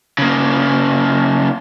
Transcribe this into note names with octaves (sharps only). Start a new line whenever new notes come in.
C#3 A#3